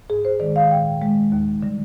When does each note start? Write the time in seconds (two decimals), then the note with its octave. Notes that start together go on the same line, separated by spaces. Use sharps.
0.10 G#2 G#4
0.25 C5
0.40 D#3 G#3 D5
0.56 F5
0.71 A#2 G5
1.02 G#3
1.32 D#2
1.63 D3 G3